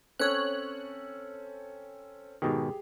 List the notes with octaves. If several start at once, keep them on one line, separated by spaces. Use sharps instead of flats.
C4 C#4 A4 C#5 F#6
G#2 B2 D#3 G4 G#4